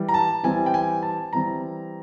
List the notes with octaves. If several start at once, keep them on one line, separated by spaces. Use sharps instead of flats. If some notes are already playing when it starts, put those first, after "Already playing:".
Already playing: E3 G3
A#5
A5
E3 G3 C4 G#5
G5
G#5
A5
E3 G3 C4 A#5